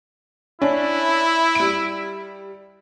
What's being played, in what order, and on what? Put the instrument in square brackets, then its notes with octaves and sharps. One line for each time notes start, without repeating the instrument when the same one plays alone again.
[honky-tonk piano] C#4 D4 [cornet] E4
[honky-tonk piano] G3 D7